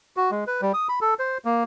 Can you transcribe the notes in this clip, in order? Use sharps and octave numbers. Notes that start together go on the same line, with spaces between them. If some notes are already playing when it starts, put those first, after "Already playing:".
F#4
G#3
B4
G3
D#6
B5
A4
C5
A#3